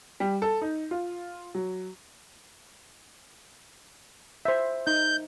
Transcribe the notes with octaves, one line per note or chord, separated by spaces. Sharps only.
G3
A4
D#4
F4
F#3
C5 E5
D#4 G6